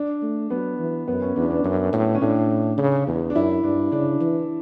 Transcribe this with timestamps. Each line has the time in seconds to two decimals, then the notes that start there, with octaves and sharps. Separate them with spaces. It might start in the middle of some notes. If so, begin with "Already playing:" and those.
Already playing: D4
0.22 A3
0.50 F#3 B3
0.79 E3
1.08 F#2 B3
1.22 C#4
1.35 E2 D4
1.50 D4
1.64 F#2
1.93 A2
2.15 C#4
2.21 A2 D4
2.78 C#3
3.07 E2
3.30 D4
3.35 F#2 E4
3.63 G2 D4
3.92 C#3 D4
4.21 E3